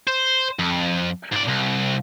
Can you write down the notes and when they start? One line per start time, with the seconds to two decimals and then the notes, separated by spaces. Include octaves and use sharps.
0.08 C5
0.59 F2
1.32 G#2 D5
1.48 C2